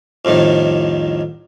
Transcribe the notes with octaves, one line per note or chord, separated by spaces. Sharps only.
C2 F2 A2 D#3